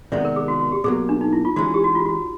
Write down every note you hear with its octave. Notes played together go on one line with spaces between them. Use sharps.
C3 D#3 G#3 B3 D5 E5
A#4
G#4
F#4
F#4
G4
B2 F#3 A#3 G#4
D4
D#4
E4
F4
E3 G#3 C#4 F#4
G4
F#4
F4
F#4